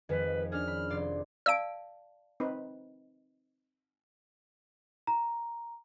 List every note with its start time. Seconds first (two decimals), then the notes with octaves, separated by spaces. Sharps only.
0.09 F2 D#3 G#3 B4
0.52 C#4 D4 G#4 F6
0.68 B5
0.90 F1 D5 C6
1.46 D5 F5 A5 E6 D7
2.40 C4 D#4 B4
5.07 A#5